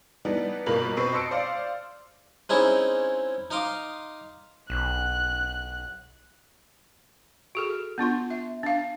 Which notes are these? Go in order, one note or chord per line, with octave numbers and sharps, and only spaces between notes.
E3 G3 B3 D4 D#4
G1 B2 A#3 A#4 B5 F#7
B2 C4 B4 C#6 C7
D#5 A5 C6 E6 C#7 D7
C5 D5 F5 C6
G#3 C4 C#4 D#4 E4 G#4
D#4 D#5 F5 C6 D6
B1 F#6
F#4 G#4 A4
B3 D4 F4 C6
E5
D4 F5